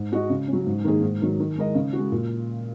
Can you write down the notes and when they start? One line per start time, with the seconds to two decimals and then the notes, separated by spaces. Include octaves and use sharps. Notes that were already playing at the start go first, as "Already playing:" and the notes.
Already playing: G#2
0.12 G#3 F#4 D#5
0.30 C#3
0.48 C#4
0.53 F#3
0.66 G#2
0.85 D#3 A#3 D#4 G#4
1.02 G#2
1.22 D#3 F#3
1.40 D#3
1.58 G#3 D#4 A#4 D#5
1.75 C#3
1.93 F#4
1.99 G#3
2.12 A#2